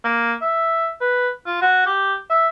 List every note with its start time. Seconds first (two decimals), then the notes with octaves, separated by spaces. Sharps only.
0.04 A#3
0.41 E5
1.01 B4
1.46 F4
1.61 F#4
1.86 G4
2.30 E5